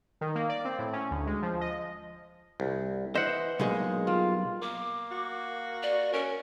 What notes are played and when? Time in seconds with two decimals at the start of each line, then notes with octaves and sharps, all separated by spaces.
0.21 D#3
0.35 A#3
0.49 D5
0.65 C4
0.79 A2
0.93 C#4
1.11 D2
1.27 G#3
1.42 F3
1.61 D#5
2.60 C2
3.15 E3 C5 D#5 E5 F#5
3.60 B1 G#3 A#3 G#4 D#5
4.07 G3 F4
4.62 A#3 D6
5.11 F#4
5.83 D5
6.13 C#4 A#4